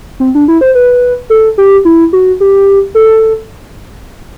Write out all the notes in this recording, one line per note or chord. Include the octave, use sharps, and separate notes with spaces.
C4
D4
E4
C5
B4
A4
G4
E4
F#4
G4
A4